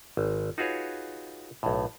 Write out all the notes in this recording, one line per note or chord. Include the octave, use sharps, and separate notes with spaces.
G#1
D#4 F4 F#4 G#4 B4 C#5
B1 A2